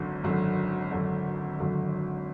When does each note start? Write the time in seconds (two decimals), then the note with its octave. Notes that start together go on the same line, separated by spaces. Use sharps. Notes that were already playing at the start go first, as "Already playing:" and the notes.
Already playing: G#1 F#2 D3
0.23 G#1 F#2 D3
0.91 G#1 F#2 D3
1.59 G#1 F#2 D3